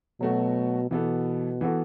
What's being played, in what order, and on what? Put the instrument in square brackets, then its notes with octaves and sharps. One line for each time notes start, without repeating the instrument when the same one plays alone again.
[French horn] B2 [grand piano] F#3 A3 F#4
[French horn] B2 [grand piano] E3 B3 A4
[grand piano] E3 B3 F#4 A4